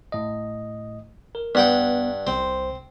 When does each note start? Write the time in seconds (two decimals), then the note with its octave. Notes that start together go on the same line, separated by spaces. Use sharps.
0.12 A2 D#5
1.35 A#4
1.55 G2 B3 F#5 G5
2.27 C2 C4 C5